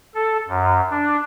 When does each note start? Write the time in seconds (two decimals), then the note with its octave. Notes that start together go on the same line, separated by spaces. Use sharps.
0.14 A4
0.48 F#2
0.90 D4